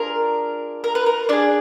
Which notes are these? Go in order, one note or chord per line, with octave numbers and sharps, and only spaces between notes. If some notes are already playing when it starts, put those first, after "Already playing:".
Already playing: D4 F4 G#4 A#4
A#4
B4
A#4
D4 F4 G#4 D5